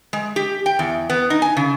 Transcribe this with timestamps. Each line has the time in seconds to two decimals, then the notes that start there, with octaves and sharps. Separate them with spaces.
0.13 G#3
0.36 G4
0.66 G5
0.79 E2
1.09 B3
1.30 D#4
1.42 G#5
1.57 C#3